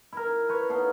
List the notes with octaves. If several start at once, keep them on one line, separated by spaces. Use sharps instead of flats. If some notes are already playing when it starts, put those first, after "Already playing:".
E4 A#4
B4 C#5
B3 D#4 A4 F5